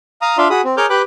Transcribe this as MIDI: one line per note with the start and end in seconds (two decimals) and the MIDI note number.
0.22 0.37 77
0.22 0.37 82
0.22 0.37 87
0.38 0.48 62
0.38 0.48 65
0.38 0.48 74
0.38 0.48 76
0.38 0.48 77
0.38 0.48 84
0.50 0.61 66
0.50 0.61 68
0.50 0.61 83
0.50 0.61 87
0.65 0.75 60
0.77 0.86 68
0.77 0.86 70
0.77 0.86 73
0.77 0.86 86
0.77 0.86 89
0.77 0.86 91
0.90 1.02 67
0.90 1.02 71
0.90 1.02 79
0.90 1.02 83
0.90 1.02 86
0.90 1.02 90